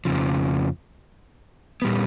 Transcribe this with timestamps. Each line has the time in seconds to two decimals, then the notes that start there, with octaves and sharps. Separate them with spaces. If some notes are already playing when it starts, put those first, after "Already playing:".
0.05 F2 C#3 F3
1.82 A#2 G3 B3